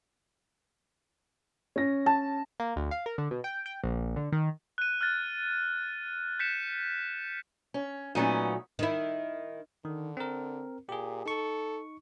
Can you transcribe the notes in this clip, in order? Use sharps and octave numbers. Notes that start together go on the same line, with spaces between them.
C#4 A#6
A5
A#3
D2
F5
A#4
D3
B2
G5
G5
A#1
D3
D#3
F#6 D#7
F6 F#6 A6
G6 B6 C#7 E7
C#4
A#2 F#3 A3 B3 C#4 D#4
D#3 E4
D3 D#3
C4 A#4
A#2 G4 G#4
D#4 A4 C#6